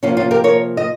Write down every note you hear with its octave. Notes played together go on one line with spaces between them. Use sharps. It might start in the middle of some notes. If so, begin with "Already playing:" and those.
C3 F3 A#3 C#4 F4
C#4 F4
G4 A#4
A#4 C#5
D#5